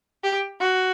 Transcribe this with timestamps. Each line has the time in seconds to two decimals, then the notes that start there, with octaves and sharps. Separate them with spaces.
0.24 G4
0.60 F#4